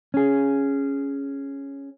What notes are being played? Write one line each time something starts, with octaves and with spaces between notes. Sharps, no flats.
C#4 G#4